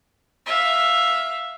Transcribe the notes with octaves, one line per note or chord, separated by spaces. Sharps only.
E5 F5